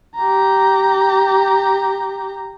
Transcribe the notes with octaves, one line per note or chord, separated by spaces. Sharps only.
G4 A#5